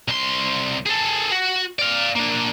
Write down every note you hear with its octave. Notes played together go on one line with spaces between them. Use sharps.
C2 C6
G#4 A4
F#4
D5 F5
A#3 D4